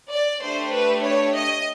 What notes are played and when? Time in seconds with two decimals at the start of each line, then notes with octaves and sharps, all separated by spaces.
0.12 D5
0.42 A3 D4 G4 C5
0.73 B4
1.05 C#5
1.36 D#5